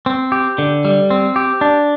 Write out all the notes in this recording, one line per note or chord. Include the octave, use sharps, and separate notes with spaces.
C4
G4
D3
G3
C4
G4
D4